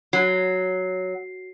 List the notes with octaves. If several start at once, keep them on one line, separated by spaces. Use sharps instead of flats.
F#3 F#4 C7